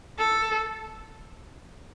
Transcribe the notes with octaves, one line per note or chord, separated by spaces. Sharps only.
A4